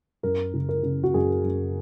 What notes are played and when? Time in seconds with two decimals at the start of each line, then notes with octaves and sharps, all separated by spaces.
0.23 F#2 A#4
0.54 C#3
0.69 A#4
0.83 C#3
1.04 F#4
1.14 F#2 G#4
1.44 F#2